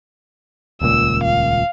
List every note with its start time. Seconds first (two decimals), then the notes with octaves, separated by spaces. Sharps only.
0.81 D#1 C#2 A#2 E6
1.24 F5